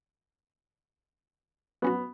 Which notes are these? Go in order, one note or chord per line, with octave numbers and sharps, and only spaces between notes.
F#3 B3 C#4 F#4